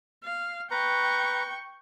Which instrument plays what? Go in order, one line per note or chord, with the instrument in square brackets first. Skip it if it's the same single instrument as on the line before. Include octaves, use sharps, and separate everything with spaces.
[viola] F5
[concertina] B4 A#5 [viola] G5 C#6